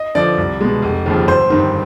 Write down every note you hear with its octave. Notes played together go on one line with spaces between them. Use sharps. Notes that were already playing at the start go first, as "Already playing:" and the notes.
Already playing: D#5
D3 F3 D5
C2
B2 G#3
F1
D#2 C#3 F3
G1 C5
G2 D#3